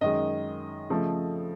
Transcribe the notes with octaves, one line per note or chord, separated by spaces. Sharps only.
F#2 D#3 G#3 D#5
C#3 F3 A3